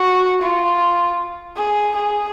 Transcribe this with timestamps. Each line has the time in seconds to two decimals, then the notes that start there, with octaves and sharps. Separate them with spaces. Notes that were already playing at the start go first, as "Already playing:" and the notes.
Already playing: F#4
0.42 F4
1.56 G#4
1.95 G#4